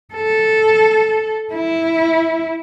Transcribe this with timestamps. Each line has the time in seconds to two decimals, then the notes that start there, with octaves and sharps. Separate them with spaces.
0.14 A4
1.54 E4